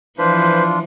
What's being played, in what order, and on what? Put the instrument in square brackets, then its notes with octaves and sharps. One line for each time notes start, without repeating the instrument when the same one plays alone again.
[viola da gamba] E3 F3 [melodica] D4 F4 [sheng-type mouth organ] B4 C5 B5